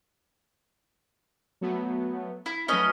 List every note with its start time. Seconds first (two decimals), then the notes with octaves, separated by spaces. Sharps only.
1.61 F#3 A3 B3
2.46 E4
2.68 F#3 A3 C#4 D#4 B4 D#5